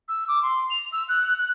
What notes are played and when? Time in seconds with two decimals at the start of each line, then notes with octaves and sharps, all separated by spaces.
0.09 E6
0.28 D6
0.42 C6
0.70 F7
0.92 E6
1.09 F#6
1.38 F#6